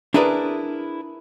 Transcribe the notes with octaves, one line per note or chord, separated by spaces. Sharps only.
D4 E4 G#4 A#4 B4 D5